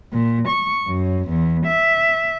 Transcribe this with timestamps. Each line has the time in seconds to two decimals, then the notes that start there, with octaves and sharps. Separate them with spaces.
0.12 A#2
0.48 C#6
0.87 F#2
1.28 E2
1.66 E5